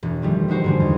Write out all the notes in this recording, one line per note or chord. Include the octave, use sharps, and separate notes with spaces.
E1
D#3 F3 G3 A3
A3 D#4 F#4 C5
G#2 D3 G3
E2